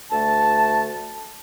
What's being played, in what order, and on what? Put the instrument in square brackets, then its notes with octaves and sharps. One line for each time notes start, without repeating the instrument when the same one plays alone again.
[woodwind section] D2 A3 A5